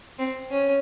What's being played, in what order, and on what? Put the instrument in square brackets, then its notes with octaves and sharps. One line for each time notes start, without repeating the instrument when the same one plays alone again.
[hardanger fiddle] C4
C#4